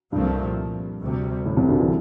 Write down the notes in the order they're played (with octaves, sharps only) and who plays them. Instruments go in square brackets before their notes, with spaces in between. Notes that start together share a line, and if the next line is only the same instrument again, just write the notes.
[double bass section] C2 A#2 F3 A3 C4 [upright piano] G2
[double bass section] D2 C3 G3
[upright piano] A2
C2 C3
D2 D3
E3